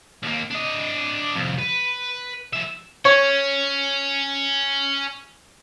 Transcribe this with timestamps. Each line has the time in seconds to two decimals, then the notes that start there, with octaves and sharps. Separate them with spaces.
0.23 D#2 A#3
0.51 D4 D#5
1.36 C2 F2
1.59 B4
2.53 F3 E5
3.05 C#4 C#5